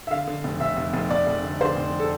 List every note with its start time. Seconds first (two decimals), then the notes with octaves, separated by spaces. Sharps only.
0.07 E5
0.11 D3 F5
0.27 D3
0.44 F1
0.60 F1 E5
0.77 F1
0.94 F1
1.11 F1 D5
1.27 F1
1.44 D3
1.61 D3 C5
1.77 F1
2.00 A4